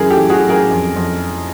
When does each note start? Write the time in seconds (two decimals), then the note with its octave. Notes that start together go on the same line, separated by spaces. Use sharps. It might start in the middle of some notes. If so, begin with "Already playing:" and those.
Already playing: F#2 E3 G#4 A#4
0.10 G4 A4
0.17 E3
0.30 F#4 G#4
0.43 F#2
0.49 G#4 A#4
0.70 F2
0.96 F2